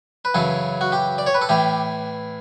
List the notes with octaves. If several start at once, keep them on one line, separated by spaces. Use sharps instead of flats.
B4
F#2 C#3 E3 A4
F#4
G4
D5
C#5
B4
A4
A2 E3 G4